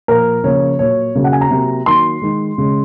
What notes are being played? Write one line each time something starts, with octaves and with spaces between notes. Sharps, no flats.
A#2 F3 A#3 A#4
C#3 F3 A#3 C#5
A#2 F#3 A#3 C#5
C#3 F#3 A#3
F#5
G#5
A#5
C3 F#3 A#3
D#3 F#3 A#3 C6
D#3 G#3
C#3 G#3